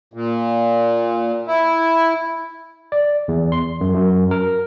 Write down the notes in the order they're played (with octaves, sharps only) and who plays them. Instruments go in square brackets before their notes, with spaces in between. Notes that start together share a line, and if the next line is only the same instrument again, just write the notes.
[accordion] A#2
E4
[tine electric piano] D5
E2
C6
F#2
F#2
A#4